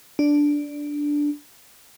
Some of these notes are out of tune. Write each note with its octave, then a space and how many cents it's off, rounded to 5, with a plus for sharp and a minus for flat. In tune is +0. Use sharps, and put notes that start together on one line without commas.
D4 -5